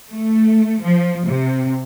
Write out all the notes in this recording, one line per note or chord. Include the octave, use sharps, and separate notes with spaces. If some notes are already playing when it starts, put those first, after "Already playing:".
A3
F3
C3